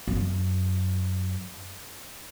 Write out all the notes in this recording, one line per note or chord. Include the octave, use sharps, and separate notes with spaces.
F#2